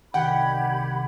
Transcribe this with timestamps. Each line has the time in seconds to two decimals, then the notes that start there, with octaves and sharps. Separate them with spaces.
0.14 C2 D#3 G4 F#5 G5 B5 G#6